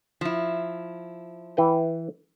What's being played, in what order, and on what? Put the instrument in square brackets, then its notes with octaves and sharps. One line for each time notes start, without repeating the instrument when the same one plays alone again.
[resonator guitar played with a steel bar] F3 E4
[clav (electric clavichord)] E3 B4 G5